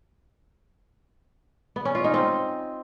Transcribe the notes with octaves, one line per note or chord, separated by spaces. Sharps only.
B3
C#4
F4
D#4
C4